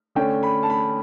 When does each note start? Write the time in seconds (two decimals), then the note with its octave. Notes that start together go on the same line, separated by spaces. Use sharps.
0.15 D3 A3 C#4 G5
0.43 B5
0.63 A5
0.70 B5